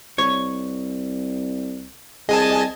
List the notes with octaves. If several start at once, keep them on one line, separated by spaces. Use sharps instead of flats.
C2 C#5
C2 G#4 D#5 G#5 A5